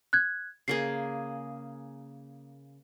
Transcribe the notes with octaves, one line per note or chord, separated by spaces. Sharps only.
F#6 G#6
C#3 A#3 G#4 C7